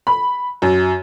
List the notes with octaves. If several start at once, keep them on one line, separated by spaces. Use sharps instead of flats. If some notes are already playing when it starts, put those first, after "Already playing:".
B5
F#2